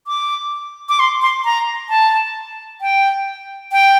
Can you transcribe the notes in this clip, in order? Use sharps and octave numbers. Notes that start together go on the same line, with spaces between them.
D6
D6
C6
C6
A#5
A5
G5
G5